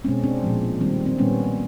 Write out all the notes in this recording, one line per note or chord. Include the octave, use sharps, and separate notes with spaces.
B2 G#3 C4 C#4
C4 D4
A#2 F3 G#3
D#3 G3 C4
C4
A#2 G3 B3 C#4